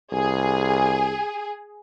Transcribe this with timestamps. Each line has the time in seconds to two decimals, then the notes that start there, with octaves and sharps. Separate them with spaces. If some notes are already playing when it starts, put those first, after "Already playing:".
0.13 C2 G#4